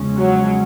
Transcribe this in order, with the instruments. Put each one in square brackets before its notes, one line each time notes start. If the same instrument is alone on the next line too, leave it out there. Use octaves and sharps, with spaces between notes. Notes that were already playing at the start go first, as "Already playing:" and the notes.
Already playing: [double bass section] E2 C#3 F3 G#3 C#4
[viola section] F#3